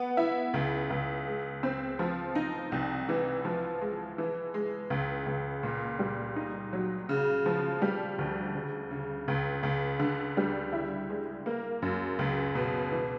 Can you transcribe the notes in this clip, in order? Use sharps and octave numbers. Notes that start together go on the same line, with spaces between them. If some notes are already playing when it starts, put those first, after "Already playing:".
Already playing: B3
E4
C#2
C#2
G#3
C4
F3
D#4
C2
E3
F3
G#3
E3
G#3
C#2
C#2
A#2
G3
D#4
F#3
C#3
F3
G3
D2
C#3
C#3
C#2
C#2
D3
G3
E4
G#3
A#3
F#2
C#2
B2
E3